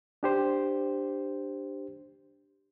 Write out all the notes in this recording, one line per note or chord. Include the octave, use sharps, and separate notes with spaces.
D4 G4 C5